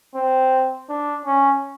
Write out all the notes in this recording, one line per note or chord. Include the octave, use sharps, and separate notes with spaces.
C4
D4
C#4